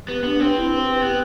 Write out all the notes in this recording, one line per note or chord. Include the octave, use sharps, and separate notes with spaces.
B3 G4
B3 D4
C4 B4
E4
B4
G4
B3 B4